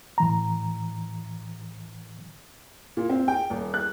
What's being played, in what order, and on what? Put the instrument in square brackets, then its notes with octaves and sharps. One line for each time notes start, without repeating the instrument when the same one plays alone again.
[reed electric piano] A2 E3 A#5
[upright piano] A#2
C4
G5
D#1
F#6